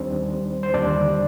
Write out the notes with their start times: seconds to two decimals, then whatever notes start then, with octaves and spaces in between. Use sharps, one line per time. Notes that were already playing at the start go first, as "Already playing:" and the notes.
Already playing: D#2 D#3 G3 C4 D4 C5
0.63 C5
0.74 D#2 D3 G3 D4 D5